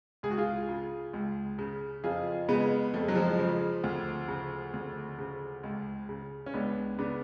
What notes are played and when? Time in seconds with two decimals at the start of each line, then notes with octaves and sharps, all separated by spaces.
0.23 C#2 G#4
0.31 F#4
0.38 F4 G#4
0.69 C#3
1.14 C#2
1.59 C#3
2.04 F2 F4 G#4
2.49 C#3 G#3 B3
2.94 F2 A3
3.01 G#3
3.08 F#3
3.15 F3 G#3
3.39 C#3
3.84 D2
4.28 C#3
4.73 D2
5.19 C#3
5.63 C#2
6.09 C#3
6.46 C#4
6.54 C#2 B3 D4
6.99 C#3 B3 D4